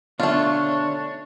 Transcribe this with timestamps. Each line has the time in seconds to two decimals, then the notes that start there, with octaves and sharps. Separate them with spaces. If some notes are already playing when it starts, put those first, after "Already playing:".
0.20 B2 D3 A3 D4 F4 C#5